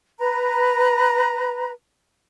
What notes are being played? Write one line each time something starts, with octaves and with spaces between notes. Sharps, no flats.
B4 A#5